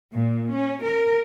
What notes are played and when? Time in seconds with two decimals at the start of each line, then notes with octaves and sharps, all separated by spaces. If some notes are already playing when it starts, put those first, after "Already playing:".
0.14 A#2
0.54 C#4
0.83 A#4